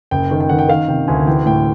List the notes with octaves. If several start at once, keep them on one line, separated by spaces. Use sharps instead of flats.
F#1 G5
D#3
G5
D#3 F#5
G5
D#3 F5
C3 G5
D2 G#5
E3 G5
A2 G5